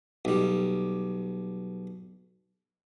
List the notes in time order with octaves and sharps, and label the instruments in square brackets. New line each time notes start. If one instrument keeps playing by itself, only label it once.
[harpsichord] B1 G3